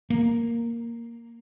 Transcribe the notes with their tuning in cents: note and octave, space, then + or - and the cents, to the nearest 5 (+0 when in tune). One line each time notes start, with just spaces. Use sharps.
A#3 +0